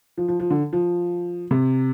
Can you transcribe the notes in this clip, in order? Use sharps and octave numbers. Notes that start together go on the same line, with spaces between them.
F3
F3
F3
D3
F3
C3